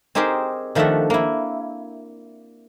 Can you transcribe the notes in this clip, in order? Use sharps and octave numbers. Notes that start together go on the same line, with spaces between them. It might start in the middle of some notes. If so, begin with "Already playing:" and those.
C4 D#4 G4 G#4 A#4 C5
D#3 F3 A3 D4 E5 F#5
A#3 E4